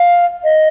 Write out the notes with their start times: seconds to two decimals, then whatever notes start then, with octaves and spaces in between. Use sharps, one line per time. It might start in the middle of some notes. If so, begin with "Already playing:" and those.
Already playing: F5
0.44 D#5